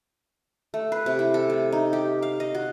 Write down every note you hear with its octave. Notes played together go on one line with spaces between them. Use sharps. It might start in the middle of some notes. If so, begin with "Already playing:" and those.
A3
B4
C3
E4
A4
A3
D#4
G4
F5
D#5
F#4